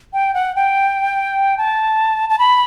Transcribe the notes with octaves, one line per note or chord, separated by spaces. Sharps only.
G5
F#5
G5
A5
A5
B5